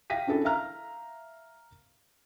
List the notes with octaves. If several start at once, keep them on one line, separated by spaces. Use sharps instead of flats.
F5 G5 A#6 B6 D#7
C#4 D4 E4 A4
E5 F5 A#5 F6